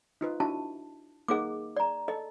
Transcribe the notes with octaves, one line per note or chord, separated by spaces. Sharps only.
D#4 F4 B4
D4 E4 F#4 A5
A#3 D#4 G#4 F#5 D6
D5 A#5
A4 D#5